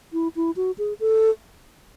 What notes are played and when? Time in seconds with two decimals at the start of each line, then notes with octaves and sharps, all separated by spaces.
0.13 E4
0.36 E4
0.56 F#4
0.78 G#4
1.00 A4